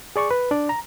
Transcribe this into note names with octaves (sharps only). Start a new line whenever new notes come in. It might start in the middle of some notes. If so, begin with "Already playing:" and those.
G#4 D5 C#6
B4
D4 D5
A#5